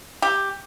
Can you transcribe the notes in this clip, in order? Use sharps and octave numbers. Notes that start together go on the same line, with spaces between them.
G4